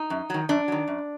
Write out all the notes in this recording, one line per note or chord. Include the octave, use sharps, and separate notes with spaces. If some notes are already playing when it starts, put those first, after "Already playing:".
Already playing: D#4
F#2
D#3 F#3
F#2 D4
D#3 F#3
F#2